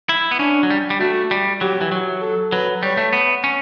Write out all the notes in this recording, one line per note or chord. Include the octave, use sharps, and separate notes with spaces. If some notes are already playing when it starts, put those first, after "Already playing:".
E4
B3
C#4 D4
F#3
G3
G3
A3 F#4
G3
F#3 G4
E3
F#3
A4
F#3 B4
G3 C#5
A3
B3
C#4